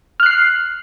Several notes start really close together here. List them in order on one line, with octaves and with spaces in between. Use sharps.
F6 F#6 C7